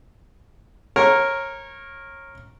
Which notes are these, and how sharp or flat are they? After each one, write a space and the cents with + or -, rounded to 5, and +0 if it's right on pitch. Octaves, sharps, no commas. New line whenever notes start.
A#4 +0 C#5 -25